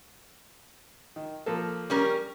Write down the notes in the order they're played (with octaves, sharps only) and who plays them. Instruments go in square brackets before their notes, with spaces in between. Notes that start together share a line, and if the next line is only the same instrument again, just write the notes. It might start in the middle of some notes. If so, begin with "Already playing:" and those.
[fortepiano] D#3
F3 A#3 A4
[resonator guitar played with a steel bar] G3 C#4 A#4